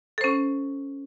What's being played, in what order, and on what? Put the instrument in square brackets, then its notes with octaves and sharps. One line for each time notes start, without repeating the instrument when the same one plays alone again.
[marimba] A4
C5
C#4